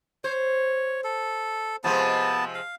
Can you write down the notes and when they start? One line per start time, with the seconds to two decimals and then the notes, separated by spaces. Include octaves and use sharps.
0.24 C5 C#5
1.04 A4
1.84 C3 F3 G#3 B3 A5
2.55 F5